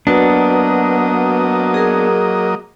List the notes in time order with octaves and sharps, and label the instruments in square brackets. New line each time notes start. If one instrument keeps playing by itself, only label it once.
[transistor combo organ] F#3 A#3 D#5 [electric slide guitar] B3 D4 [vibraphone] F#4 B4
[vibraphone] G#4 A#4